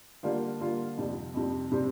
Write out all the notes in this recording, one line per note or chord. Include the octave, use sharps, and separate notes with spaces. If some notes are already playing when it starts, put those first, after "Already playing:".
D3 G3 A#3 F4
D3 G3 A#3 F4
F2 C3 G3
F2 C3 G3
C3 G3 C4